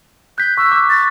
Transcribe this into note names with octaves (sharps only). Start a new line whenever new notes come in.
F#6 G6 B6
C#6 E6 F#6
D6
A6